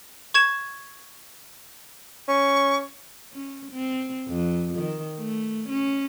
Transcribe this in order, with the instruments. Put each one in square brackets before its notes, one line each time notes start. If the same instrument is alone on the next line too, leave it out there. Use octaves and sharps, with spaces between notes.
[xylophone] C#6 G#6 E7
[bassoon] C#4 [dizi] C#6
[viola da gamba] C#4
C4
F2
D#3
A3
C#4